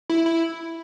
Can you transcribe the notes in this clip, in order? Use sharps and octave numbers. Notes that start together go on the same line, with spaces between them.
E4
E4